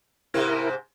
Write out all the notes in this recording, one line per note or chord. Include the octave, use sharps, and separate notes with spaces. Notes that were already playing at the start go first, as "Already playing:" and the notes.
G#2 C3 C4 E4 A#4